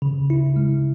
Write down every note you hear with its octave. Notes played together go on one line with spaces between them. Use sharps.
C#3
E4
G#3